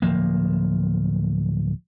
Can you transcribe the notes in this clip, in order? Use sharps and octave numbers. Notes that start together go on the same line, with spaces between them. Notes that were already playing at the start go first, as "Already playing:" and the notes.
D1 F3 A#3